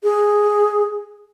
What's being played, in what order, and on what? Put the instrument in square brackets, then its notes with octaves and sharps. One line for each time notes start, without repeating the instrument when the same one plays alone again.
[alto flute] G#4